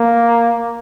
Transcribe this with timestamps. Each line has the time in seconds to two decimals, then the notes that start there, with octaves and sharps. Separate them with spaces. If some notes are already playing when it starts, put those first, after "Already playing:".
Already playing: A#3